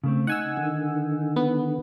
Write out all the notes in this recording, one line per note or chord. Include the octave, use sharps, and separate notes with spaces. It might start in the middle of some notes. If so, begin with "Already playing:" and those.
C#3 A3 C4
D#4 F#5 G#5 E6
D3 D#3
B3